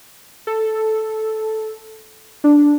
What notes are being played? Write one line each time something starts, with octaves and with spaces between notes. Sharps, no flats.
A4
D4